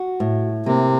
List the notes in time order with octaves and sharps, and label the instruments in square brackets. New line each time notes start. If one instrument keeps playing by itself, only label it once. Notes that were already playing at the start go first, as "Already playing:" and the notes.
Already playing: [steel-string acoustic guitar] F#4
A2
[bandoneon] C3 [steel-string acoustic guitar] A#3